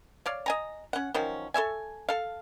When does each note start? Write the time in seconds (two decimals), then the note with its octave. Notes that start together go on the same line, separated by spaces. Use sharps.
0.26 C#5 D5 F5
0.46 D#5 G#5 A#5
0.93 C#4 F#5
1.14 D#3 F3 F#3 C#4
1.54 A4 C#5 E5 G#5
2.09 A4 F5